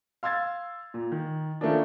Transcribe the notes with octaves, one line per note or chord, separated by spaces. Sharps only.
F5 C6 E6 G#6 A6
A#2
D#3
D#3 F3 A3 A#3 C#4 D4